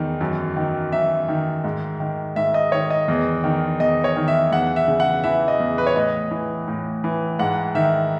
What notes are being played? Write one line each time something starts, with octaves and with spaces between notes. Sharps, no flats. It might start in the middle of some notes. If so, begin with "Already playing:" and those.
Already playing: E2 D#3
F#2
D#3
F#2 E5
D#3
G#2
D#3
G#2 E5
D#5
D#3 C#5
D#5
E2
D#3
E2 D#5
C#5
D#3
E5
E2 F#5
E5
C#3
F#5
E3 E5
D#5
E2
B4
C#5
A2 D#5
E3
A2
E3
G#2 F#5
D#3 E5